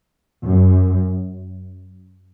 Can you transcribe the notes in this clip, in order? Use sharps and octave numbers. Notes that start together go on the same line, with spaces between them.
F#2